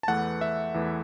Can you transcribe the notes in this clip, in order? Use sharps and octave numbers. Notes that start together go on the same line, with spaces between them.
A5
E2 E3 A3 F#5
E5
E2 E3 A3